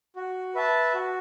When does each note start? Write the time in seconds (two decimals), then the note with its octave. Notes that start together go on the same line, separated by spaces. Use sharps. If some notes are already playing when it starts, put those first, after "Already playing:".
0.16 F#4
0.55 B4 E5 A5
0.94 F#4